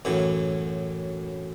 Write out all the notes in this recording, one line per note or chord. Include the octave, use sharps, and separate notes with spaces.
F#2 A2 E3